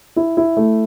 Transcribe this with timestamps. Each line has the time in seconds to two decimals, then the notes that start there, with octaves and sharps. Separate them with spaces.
0.16 E4
0.37 E4
0.57 A3